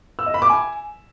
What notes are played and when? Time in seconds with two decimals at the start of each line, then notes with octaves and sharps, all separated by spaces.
0.19 E6
0.26 D#5
0.34 B5
0.42 D6
0.50 G#5